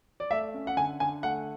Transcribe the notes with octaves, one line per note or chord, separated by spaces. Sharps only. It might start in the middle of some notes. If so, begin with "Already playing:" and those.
D5
A3 E5
C#4
F#5
D3 G#5
D3 G#5
A3 F#5